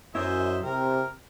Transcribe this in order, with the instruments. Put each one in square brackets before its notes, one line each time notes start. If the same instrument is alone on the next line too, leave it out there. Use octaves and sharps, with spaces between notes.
[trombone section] F#2 [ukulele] E4 [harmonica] C5 D#5 E5
[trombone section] C3 [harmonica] A#4